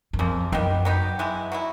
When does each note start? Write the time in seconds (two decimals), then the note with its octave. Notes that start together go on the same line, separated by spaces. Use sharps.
0.13 F#2
0.19 F2 C#3 F3 A#3
0.52 F#2 D#3 G3 B3
0.85 F#3 B3 D#4 G4
1.19 E3 G#3 B3 E4
1.52 F#3 B3 E4